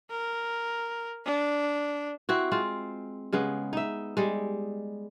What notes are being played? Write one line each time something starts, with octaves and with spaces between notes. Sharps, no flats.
A#4
D4
C4 E4 F#4
G#3 C4 F4
C#3 G#3 B3
D#4 E5
G3 G#3